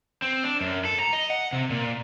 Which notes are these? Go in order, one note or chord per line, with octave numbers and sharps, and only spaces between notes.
C4
D4
F#2
A4
A#5
D#5
F#5
C3
A#2